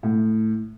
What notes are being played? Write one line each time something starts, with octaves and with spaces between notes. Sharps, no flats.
A2